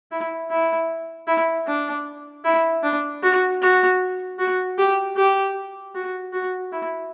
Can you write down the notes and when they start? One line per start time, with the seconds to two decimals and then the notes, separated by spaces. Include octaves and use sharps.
0.11 E4
0.51 E4
1.27 E4
1.67 D4
2.45 E4
2.83 D4
3.23 F#4
3.62 F#4
4.39 F#4
4.78 G4
5.16 G4
5.95 F#4
6.33 F#4
6.72 E4